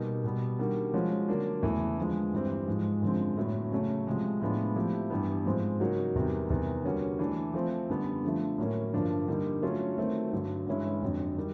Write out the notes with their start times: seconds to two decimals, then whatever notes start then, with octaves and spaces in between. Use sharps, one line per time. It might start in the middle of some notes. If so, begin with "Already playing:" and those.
Already playing: B2 G3 A#3 D#4
0.24 B2 G3 B3
0.59 D#3 G3 A#3 D4 F#4
0.94 F3 G#3 C#4 F#4
1.28 D3 F#3 A#3 D4
1.63 E2 C#3 E3 A3
1.98 D3 F3 G#3
2.32 G2 E3 G3 C4
2.67 G#2 F3 G#3
3.02 F#2 D3 F3 G#3 C4
3.37 A2 F#3 B3 D4
3.71 C#3 F#3 A3 C#4
4.07 C3 F3 G#3
4.41 A2 F3 G#3 B3 D4
4.76 F3 A3 C4 E4 G4
5.10 G2 E3 G3 B3
5.46 G#2 F3 G#3 C4
5.80 C#3 F#3 A#3 D#4 F#4
6.15 E2 C3 D#3 G3
6.50 E2 C3 D#3
6.84 D3 G3 A#3 C#4 F#4
7.19 E3 A3 D4
7.54 F3 A3 C4
7.89 F#2 D3 G3 B3 D4
8.23 D3 F3 A3
8.58 A2 F#3 A#3 C#4
8.93 G2 D3 F3 A#3 D4
9.28 D3 G3 A#3 D#4
9.63 D3 F#3 A3 C#4 F4
9.98 D#3 F#3 A3 C4
10.33 G2 D3 F#3
10.67 G2 E3 G#3 C#4 E4
11.02 F2 D3 F#3
11.37 D#3 G3